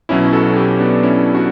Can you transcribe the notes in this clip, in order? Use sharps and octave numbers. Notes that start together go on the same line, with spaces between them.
B1 B2 F#3 C#4 E4
F#4 A4
E4 G4
B3 D4
C#4 E4
D4 F#4